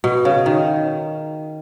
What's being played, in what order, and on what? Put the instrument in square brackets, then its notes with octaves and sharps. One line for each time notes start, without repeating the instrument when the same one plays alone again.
[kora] B2
C#3
D#3